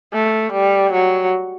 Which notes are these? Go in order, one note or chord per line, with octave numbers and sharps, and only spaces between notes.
A3
G3
F#3